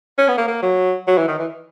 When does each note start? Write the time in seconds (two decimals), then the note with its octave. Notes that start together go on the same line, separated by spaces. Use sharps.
0.18 C#4
0.28 B3
0.38 A#3
0.48 A#3
0.63 F#3
1.08 F#3
1.18 E3
1.28 D#3
1.39 E3